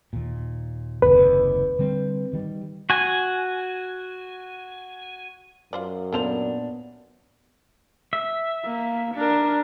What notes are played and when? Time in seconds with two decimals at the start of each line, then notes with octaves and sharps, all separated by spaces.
0.13 D#2 A#2
1.02 F#1 D#2 C3 B4
1.79 D3 G3 C4
2.33 D#3 G3
2.90 F#4 G#5
5.73 F#2 F4 C5 D5
6.13 A#2 A#3 B3 D4 F#4 A4 C5 F7
8.13 E5
8.65 A#3
9.15 D4 A#4